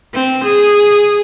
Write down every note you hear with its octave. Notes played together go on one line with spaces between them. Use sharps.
C4
G#4